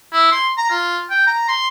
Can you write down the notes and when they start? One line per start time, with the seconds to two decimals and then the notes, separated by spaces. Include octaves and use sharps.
0.13 E4
0.31 C6
0.57 A#5
0.70 F4
1.10 G5
1.27 A#5
1.48 C6